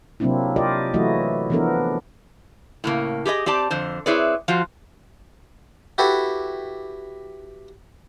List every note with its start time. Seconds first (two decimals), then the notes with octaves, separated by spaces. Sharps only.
0.20 C3 F#3 A#3 C4 D4 E4
0.56 F4 G4 A#4 D5 D#5
0.94 E3 F#3 A3 E4 F#4 D#5
1.50 E3 F3 B3 D4 A4 A#4
2.84 A2 C#3 A#3
3.25 G4 G#4 B4 D#5
3.46 C4 G4 D5 A5
3.70 F2 D3 C5
4.06 C4 E4 G#4 B4 C#5 D5
4.48 F3 F4 F#4 C5
5.98 E4 F#4 G4 A4 B4